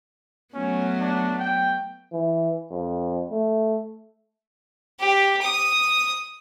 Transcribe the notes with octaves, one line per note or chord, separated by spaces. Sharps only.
F#3 A3 B3 C#4
D4
G5
E3
F2
A3
G4
D#6